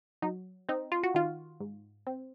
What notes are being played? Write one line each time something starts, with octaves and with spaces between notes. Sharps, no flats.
F#3 D#4
C4 D#4
F4
F#4
D#3 F4
G#2
C4